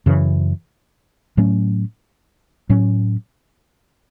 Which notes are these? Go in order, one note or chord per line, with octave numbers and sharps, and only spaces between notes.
F#2 C#3 E3
A2 F#3 A3 C#4
A2 F#3 C#4